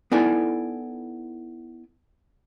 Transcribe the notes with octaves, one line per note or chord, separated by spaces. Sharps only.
B3 D#4 E4 A4 D5 G#5